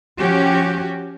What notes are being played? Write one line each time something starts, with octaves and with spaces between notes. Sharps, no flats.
F3 C#4 F#4 G4